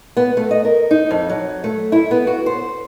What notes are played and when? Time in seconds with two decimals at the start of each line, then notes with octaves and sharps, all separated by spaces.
0.17 B3
0.37 A3
0.51 D#5
0.65 A#4
0.91 D#4
1.11 F2
1.29 F#3
1.64 A3
1.92 E4
2.11 B3
2.27 F#4
2.46 C5